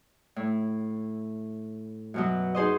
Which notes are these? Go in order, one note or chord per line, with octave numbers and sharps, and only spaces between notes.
A2
F#2 B2 F#3
D#4 G#4 C5 D#5